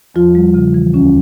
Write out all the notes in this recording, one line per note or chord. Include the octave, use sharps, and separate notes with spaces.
E2 F3 F4
G3
C#3
E3
D2 C#4